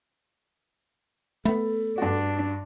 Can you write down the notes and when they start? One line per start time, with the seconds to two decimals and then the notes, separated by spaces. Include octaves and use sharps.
1.45 A3 B3 A4 B5
1.98 G2 D4 F#4